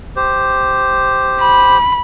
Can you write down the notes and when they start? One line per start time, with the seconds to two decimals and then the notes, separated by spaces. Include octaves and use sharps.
0.16 G4 C5
1.40 B5